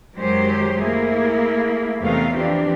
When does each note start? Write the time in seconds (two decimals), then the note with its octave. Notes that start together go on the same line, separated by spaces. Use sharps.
0.16 F#2 D#3 F#3 G#3 G4 C5
0.82 A3 A#3 E4 G#4
1.99 E2 C3 A3 B3 D#4 F5
2.33 E3 F3 C4 D4 G4